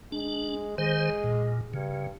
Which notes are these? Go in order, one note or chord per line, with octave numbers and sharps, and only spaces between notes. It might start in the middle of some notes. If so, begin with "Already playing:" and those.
G#3 D4
D#3 G#3 C5
A#2
G2 C#3